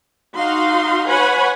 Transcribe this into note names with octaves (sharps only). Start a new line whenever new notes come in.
D#4 F#4 F5 C6
B4 C#5 F#5 G#5 B5